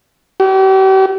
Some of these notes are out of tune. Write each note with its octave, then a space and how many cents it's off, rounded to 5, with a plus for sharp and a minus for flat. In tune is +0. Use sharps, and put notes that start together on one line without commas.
G4 -40